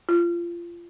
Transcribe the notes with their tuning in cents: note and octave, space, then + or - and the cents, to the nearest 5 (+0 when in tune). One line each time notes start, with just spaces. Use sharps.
F4 -25